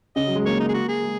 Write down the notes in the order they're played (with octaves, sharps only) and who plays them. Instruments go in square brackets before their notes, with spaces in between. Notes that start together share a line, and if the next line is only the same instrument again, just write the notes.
[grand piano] C#3 [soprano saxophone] D#5
[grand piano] F#3
G#3
[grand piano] A#3 [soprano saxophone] C#5
[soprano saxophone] D#4
G#4
F#4
G#4
[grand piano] G#3